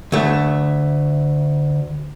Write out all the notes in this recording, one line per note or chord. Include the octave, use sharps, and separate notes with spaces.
D2 A3